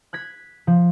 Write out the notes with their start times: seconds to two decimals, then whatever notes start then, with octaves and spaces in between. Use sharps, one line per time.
0.13 F#6 G#6 B6
0.67 F3